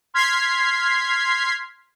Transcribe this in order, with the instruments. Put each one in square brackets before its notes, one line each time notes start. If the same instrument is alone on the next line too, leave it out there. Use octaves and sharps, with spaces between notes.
[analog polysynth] C6 F6 G#6 B6 C7